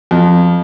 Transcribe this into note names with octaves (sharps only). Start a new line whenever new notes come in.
F2